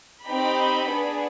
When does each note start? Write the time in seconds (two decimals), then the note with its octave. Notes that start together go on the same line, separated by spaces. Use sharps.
0.25 C4 D#4 G4 B5
0.88 B3 D4 G#4